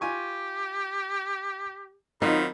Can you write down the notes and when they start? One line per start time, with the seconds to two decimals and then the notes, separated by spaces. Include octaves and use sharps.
0.01 F4 G4 G#5 C#6
2.22 D#3 F#3 C4 D#4 F4 B5